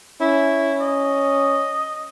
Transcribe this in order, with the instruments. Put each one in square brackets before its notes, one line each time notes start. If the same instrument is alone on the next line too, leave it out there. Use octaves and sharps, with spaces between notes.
[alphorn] C#4 [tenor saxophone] E4
[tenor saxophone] D#5